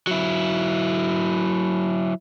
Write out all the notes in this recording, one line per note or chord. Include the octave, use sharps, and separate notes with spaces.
F#3 E4